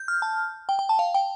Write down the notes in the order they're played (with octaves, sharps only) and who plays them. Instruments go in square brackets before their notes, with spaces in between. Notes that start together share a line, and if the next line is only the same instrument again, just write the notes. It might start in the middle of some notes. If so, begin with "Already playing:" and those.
Already playing: [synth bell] G6
F6
A5
G5
G5
A5
F5
G5